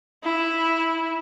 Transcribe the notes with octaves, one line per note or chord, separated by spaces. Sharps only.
E4